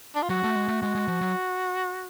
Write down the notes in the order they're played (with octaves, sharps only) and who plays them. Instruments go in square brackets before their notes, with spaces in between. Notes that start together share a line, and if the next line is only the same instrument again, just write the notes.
[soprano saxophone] D4
F4
[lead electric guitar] F#3 [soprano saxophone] F#4
[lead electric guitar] A3
G#3
A3
[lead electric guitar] G#3 [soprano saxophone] F#4
[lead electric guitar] G#3
F3
F#3